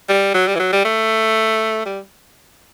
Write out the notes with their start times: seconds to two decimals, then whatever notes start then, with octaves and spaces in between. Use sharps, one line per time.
0.09 G3
0.34 F#3
0.47 G3
0.55 E3
0.59 F#3
0.72 G3
0.85 A3
1.86 G3